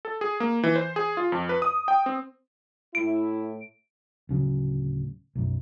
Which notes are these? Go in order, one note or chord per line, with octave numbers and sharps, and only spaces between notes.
A4
G#4
A#3
E3
C5
G#4
F4
F2
B4
D#6
G5
C4
A2 E4 D7
D1 C#3 F#3
B1 F#2